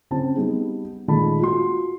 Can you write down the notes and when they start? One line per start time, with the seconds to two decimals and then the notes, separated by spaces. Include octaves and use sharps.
0.11 C#3 C4 A5
0.36 G3 B3 D#4 G#4
1.08 A#2 D#3 G#3 A4 A5 B5
1.40 F4 F#4 C6